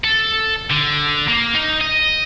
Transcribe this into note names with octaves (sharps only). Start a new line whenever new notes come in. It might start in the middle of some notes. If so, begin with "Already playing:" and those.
A4
D3
A#3
D#4
D#5